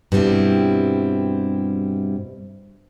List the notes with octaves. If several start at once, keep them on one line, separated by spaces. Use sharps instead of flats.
G2 B2 G3 C4 E4